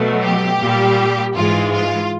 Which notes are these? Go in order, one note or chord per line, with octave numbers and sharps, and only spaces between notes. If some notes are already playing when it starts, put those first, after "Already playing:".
Already playing: B2 F#3 A3
G4
A#2 G3
G#2 E3 G#3 F4
F4